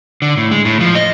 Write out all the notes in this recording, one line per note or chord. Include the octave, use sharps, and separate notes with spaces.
D3
A2
G#3
A2
F3
D#5